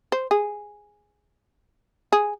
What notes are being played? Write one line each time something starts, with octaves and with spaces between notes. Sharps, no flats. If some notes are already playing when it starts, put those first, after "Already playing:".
C5
G#4
G#4